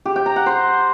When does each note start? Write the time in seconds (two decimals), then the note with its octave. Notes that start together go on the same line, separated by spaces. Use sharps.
0.05 G4
0.16 G5
0.26 A#5
0.36 F#5
0.46 C5